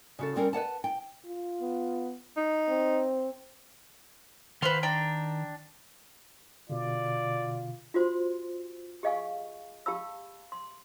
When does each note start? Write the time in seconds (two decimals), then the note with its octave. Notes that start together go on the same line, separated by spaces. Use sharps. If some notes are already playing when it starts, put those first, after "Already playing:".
0.19 C#3 F#4 A4
0.36 G3 C4 C#4 A#4
0.53 B4 C#5 F#5 A5
0.84 G5
1.26 F4
1.61 B3
2.37 D#4
2.68 C4
4.62 D#3 B4 C5 F5 C6
4.83 D4 G5 A#5
6.70 B2 D3 F4 D5
7.94 F4 F#4 C5 C6
9.03 G4 G#4 D#5 F5 G#5 C#6
9.86 G4 F5 A5 B5 E6
10.52 C6